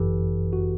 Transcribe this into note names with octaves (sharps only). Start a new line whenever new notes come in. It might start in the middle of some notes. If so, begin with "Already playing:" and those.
Already playing: G1 F#2 E3 G4 A4 B4
F#4